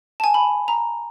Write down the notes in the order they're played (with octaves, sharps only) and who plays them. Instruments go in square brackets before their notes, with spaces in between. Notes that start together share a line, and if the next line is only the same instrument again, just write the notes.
[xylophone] G#5 A5
B5
A#5